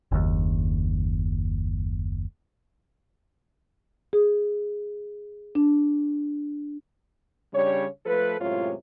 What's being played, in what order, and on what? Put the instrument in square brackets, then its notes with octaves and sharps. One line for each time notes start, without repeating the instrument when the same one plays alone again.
[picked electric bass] F#1 D#2
[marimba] G#4
D4
[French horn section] C#3 G3 D4 C#5
F3 A3 A4 B4
F#2 A2 C3 G#3 F4 C#5